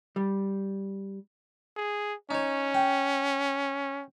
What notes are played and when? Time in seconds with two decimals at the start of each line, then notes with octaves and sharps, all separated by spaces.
0.16 G3
1.76 G#4
2.31 C#4 D#4 C#5
2.74 G5